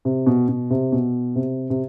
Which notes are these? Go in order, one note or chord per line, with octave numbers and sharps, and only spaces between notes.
C3
B2
B2
C3
B2
C3
C3